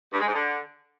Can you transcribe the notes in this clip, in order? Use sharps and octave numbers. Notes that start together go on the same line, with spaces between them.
G2
G#3
G#2
D3